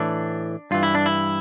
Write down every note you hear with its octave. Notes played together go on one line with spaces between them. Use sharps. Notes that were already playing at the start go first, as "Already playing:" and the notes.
Already playing: A2 E3 D4
G2 E3 F4
E4
D4
E4